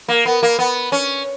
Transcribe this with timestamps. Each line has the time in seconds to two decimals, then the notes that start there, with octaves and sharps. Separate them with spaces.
0.08 A#3
0.25 B3
0.43 A#3
0.59 B3
0.92 C#4